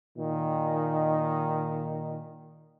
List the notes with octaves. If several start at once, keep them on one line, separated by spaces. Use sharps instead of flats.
A#2 D#3